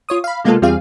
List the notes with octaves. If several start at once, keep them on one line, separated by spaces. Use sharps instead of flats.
F4 C#5 D#6
F5 B5
C3 G#3 A#3 B3 F4 A4
E2 G3 C4 F4 G#4 F5